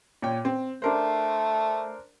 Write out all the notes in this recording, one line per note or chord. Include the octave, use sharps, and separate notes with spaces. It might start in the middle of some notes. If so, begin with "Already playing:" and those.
A#2 C#5 G5
C4
A3 D4 A#4 C5